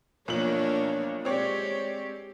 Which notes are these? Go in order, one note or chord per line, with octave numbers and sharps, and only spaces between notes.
B1 F3 A#3 D4 C#5 F#7
G#3 C4 G4 C#5 D5